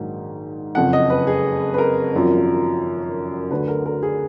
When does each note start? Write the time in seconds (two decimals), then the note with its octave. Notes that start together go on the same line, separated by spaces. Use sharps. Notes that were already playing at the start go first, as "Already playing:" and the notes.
Already playing: A#1 G#2 D#3 F#3
0.75 F#1 F2 F3 F#5
0.93 D#5
1.10 B4
1.27 G#4
1.74 B4
1.78 A#4
2.14 G#1 F#2 F3
3.51 D2 D3 F#3 B4
3.68 A#4
3.86 A#4
4.03 G#4